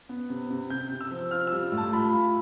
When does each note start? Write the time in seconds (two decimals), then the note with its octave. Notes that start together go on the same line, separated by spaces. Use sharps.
0.09 B3
0.30 C3
0.50 C3
0.70 C3 G6
0.91 C3
1.01 E6
1.11 F3
1.31 F4 F6
1.47 E6
1.52 G3
1.72 A2
1.77 A5
1.93 F4 B5
2.13 F4